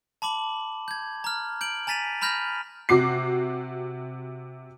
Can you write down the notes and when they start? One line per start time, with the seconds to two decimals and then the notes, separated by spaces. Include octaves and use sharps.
0.22 A5 B5 D6 F#7
0.88 G6 G#6
1.24 A#5 F6
1.61 G6 D7 F#7
1.87 G#5 A#5 A6 B6 D#7 F7
2.21 A#5 B5 F6 G6 A#6 F7
2.89 C3 F#4 D6 C7